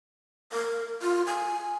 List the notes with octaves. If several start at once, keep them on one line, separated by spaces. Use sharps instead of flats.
A#4
F4
G#5